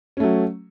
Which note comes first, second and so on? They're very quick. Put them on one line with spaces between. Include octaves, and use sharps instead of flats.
C#4 A3 F#3